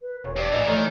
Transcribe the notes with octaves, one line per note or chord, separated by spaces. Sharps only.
B4
E1 C#5
G2 D5
A1 G#2 E3 D#5
D#3 E3 A3 B4 C#5